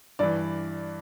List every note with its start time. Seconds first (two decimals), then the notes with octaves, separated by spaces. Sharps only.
0.19 G2 E3 D5